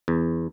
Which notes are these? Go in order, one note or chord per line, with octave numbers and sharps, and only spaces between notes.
E2